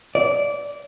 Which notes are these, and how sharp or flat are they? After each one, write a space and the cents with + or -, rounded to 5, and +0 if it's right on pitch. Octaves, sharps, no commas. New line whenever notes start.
D5 -20